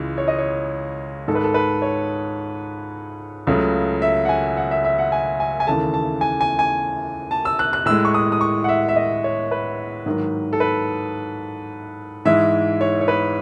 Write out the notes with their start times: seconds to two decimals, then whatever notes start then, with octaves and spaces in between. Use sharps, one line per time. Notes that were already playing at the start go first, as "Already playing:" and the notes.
Already playing: C#2 C#3 E3 G#3
0.18 C#5
0.28 D#5
0.38 C#5
1.28 G#2 D#3 G#3 A4
1.35 B4
1.44 A4
1.54 B4
1.82 C#5
3.47 C#2 C#3 F#3 A3
4.02 E5
4.25 F#5
4.29 G#5
4.57 F#5
4.71 E5
4.84 E5
4.98 F#5
5.12 G#5
5.40 G#5
5.60 G#5
5.67 D#2 C#3 E3 A3 A5
5.94 A5
6.21 G#5
6.41 G#5
6.59 G#5
7.31 A5
7.45 E6
7.59 F#6
7.73 F#6
7.86 A2 G#3 E6
8.05 C#6
8.14 D#6
8.32 D#6
8.41 C#6
8.64 F#5
8.69 E5
8.89 E5
8.96 D#5
9.24 C#5
9.51 B4
10.06 G#2 D#3 F#3
10.53 A4
10.60 B4
12.25 G#2 E3 G#3 E5
12.81 C#5
13.01 C#5
13.08 B4